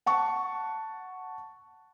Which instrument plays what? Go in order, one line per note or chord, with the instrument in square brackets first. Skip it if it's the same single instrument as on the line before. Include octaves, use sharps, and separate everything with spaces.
[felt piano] F#5 A5 C#6